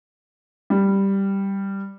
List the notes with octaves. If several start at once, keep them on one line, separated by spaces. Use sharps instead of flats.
G3